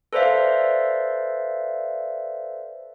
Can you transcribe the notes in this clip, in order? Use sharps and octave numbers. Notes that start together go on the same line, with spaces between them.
A4 B4 C5 D5 E5 F5